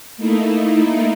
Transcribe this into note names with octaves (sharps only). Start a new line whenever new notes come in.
A3 A#3 D#4 E4